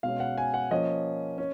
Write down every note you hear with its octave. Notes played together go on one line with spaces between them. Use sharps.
B2 G#3 C#4 F5
F#5
G#5
F#5
F3 A#3 C#4 D#5
C#4